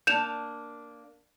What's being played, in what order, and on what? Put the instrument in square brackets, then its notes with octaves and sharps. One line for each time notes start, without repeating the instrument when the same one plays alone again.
[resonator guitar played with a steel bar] A#3 D4 [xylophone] G6 E7 F7